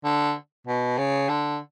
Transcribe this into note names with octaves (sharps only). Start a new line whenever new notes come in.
D3
B2
C#3
D3